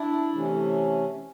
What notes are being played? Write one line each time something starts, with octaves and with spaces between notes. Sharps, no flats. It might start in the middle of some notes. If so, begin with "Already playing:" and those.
Already playing: D4 E4
C3 E3 A3 C#4